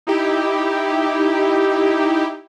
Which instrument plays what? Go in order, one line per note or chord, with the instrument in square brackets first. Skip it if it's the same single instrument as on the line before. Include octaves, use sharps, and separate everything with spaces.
[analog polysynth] D#4 E4 G4